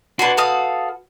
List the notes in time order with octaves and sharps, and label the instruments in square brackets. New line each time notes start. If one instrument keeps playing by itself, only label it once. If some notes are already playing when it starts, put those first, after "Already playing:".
[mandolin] D4 G#5 C6 [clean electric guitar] F#4 B4
[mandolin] A4 F5 D#6